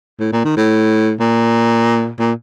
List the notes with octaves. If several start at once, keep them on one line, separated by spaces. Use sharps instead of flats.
A2
A#2
D#3
A2
A#2
A#2